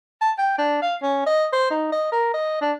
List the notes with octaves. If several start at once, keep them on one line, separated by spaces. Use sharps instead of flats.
A5
G5
D4
F5
C#4
D#5
C5
D#4
D#5
A#4
D#5
D4